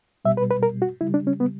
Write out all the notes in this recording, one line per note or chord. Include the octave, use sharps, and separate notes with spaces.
B2 G3 E5
B4
B4
A#4
F#4
C#3 G3 E4
D4
C#4
B3